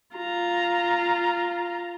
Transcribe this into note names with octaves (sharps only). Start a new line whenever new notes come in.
F4 A#5